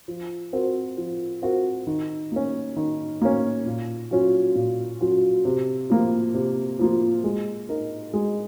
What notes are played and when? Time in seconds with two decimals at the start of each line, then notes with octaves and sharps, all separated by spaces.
0.08 F3
0.53 C4 F#4 A#4
0.97 F3
1.42 C4 F#4 A#4
1.87 D#3
2.32 A#3 C#4
2.76 D#3
3.22 A#3 C#4
3.66 A#2
4.11 F#3 C#4 F4
4.55 A#2
5.01 F#3 C#4 F4
5.45 C3
5.90 F3 A#3 F4
6.34 C3
6.79 F3 A#3 F4
7.24 G#3
7.69 D#4 A#4
8.14 G#3